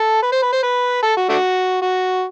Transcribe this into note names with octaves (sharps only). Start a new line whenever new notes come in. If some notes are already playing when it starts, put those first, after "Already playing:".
Already playing: A4
B4
C5
B4
C5
B4
A4
F#4
A3 D4 F#4
F#4